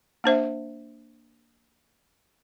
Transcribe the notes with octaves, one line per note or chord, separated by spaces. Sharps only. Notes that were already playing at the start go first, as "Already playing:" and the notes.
A#3 D4 C5 E5